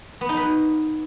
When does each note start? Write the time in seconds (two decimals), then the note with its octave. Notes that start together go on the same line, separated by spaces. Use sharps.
0.21 B3
0.29 D#4
0.37 B4